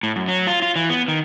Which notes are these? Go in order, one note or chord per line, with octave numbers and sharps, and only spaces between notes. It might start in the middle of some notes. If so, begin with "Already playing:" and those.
A2
F#2
F#3
F4
F4
E3
B3
D#3